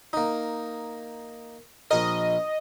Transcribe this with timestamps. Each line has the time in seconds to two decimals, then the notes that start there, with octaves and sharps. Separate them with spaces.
0.13 A#3 D#4
1.91 A#1 A#4 D#5